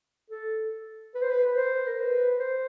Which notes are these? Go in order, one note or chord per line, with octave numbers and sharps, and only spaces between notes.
A4
B4
C5
B4
B4
C5
A#4
B4
C5